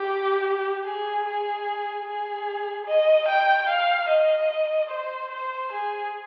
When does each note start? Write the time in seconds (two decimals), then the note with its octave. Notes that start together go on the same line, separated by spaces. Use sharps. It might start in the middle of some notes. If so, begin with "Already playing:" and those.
Already playing: G4
0.85 G#4
1.25 G#4
2.06 G#4
2.87 D#5
3.28 G5
3.68 F5
4.09 D#5
4.90 C5
5.31 C5
5.72 G#4